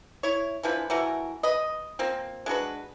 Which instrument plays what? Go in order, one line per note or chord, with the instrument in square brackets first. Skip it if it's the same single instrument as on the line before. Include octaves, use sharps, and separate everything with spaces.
[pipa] E4 C#5
D3 E3 F3 B4
E3 A3 F#4 A#4
B4 D#5
F3 A#3 C4
G#3 D4 F#4 B4